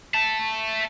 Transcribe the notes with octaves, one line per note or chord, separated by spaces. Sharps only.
E5 A5